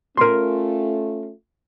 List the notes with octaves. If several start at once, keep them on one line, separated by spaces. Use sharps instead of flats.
A3 C#4 F4 A#4 C6